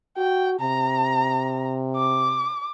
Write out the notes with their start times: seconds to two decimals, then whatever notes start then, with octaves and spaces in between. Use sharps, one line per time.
0.17 F#4 G5
0.60 C3 A#5
1.96 D6